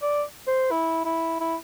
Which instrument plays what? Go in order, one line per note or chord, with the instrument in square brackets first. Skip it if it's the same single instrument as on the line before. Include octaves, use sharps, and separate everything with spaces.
[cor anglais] D5
C5
E4
E4
E4